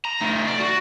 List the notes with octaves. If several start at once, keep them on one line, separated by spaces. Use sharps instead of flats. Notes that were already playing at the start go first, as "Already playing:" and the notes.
A#5
A3 D#4
D5
F#4